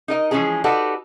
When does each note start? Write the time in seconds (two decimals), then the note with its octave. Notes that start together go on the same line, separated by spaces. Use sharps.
0.08 D#4 A#4 D#5
0.31 E3 F3 G#3 C#4 G#4
0.64 D#4 F#4 G4 A4 B4 D5